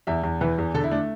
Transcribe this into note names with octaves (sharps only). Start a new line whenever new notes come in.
E2 E5
E2
E3 B4
E2
D3 A4
E4
A3 D4